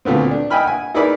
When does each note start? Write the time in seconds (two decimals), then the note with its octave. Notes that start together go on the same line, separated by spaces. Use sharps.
0.05 D2 A#2 A3 B3 C4
0.31 D4
0.50 D#5 E5 G5 G#5 B5 F6
0.64 F#5 G#5
0.94 D#4 E4 G#4 A#4 B4 D5